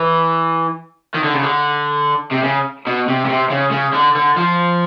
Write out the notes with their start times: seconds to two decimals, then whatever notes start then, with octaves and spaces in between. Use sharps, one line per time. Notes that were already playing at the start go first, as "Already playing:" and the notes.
Already playing: E3
1.15 D#3
1.24 D3
1.34 C#3
1.43 D3
2.32 C3
2.43 C#3
2.87 B2
3.08 C3
3.25 C#3
3.29 C3
3.51 C#3
3.72 C#3
3.93 D3
4.15 D3
4.36 F3